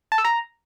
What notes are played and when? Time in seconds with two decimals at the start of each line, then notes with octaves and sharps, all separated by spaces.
0.12 A5
0.18 E6
0.25 A#5